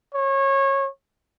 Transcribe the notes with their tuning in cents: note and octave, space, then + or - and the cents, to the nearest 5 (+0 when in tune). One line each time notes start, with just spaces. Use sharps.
C#5 -25